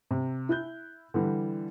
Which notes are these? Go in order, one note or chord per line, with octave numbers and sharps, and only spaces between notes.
C3
E4 F#6 G6
D3 E3 G3